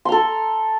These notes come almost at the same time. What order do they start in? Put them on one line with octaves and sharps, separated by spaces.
C6 A#5 A4